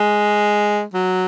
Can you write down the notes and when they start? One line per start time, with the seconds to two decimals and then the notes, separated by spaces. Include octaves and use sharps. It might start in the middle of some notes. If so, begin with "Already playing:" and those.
Already playing: G#3
0.94 F#3